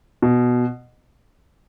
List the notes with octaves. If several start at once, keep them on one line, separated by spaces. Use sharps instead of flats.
B2